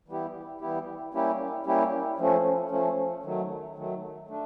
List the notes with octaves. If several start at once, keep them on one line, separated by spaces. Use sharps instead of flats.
E3 G3 B3 E4 G4
E3 G3 B3 E4 G4
G3 A#3 C#4 E4 G4
G3 A#3 C#4 E4 G4
F3 A3 C#4
F3 A3 C#4
D#3 F#3 A3
D#3 F#3 A3
A3 D4